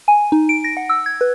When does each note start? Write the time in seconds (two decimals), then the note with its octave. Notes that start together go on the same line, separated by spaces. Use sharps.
0.08 G#5
0.32 D#4
0.49 D7
0.64 A#6
0.77 F#5
0.90 E6
1.06 G#6
1.21 B4